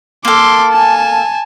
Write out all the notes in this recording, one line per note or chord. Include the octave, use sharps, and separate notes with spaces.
A#3 A4 C6 D6
G#5 A5